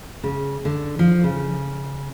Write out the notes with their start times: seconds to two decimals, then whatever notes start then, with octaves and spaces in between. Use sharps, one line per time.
0.24 C#3
0.65 D3
0.99 F3
1.24 C#3